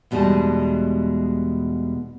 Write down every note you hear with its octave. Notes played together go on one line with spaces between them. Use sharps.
E2 B2 G3 G#3 D#4 A5